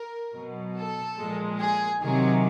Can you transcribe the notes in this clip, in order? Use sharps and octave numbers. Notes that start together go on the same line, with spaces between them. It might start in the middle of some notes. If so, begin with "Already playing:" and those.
Already playing: A#4
B2 F#3
A4
A#2 F3 G#3
G#4
C3 D#3 F#3 G#4